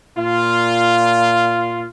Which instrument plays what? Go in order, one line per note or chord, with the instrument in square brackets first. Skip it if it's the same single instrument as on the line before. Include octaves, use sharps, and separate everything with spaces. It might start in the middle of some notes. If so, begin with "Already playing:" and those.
[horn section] A#2 F4